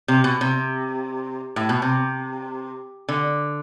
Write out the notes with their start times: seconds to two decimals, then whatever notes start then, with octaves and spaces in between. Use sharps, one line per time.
0.08 C3
0.24 B2
0.41 C3
1.56 A2
1.69 B2
1.82 C3
3.09 D3